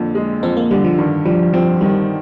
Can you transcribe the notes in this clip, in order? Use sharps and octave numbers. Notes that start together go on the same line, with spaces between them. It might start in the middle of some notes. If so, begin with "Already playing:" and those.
Already playing: F2 D3 A#3
G#3
F2 C4
A#3
D3 G3
F3
G2 D#3
F3 G3
F3 C4
D#3 G3